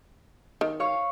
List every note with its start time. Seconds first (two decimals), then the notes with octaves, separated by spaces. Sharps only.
0.61 D#3
0.80 C#5 F5 C#6